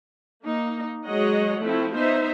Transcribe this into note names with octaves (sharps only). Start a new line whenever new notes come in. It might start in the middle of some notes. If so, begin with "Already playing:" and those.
A#3 D#4
F#3 G#3 C#5 D#5 F#5
F3 A3 C4 E4
B3 D#4 C5 E5